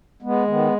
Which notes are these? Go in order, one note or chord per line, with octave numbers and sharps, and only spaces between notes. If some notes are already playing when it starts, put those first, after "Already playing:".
G#3 B3
D#3 B3